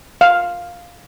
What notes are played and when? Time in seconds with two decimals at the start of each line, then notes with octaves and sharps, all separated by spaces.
0.21 F5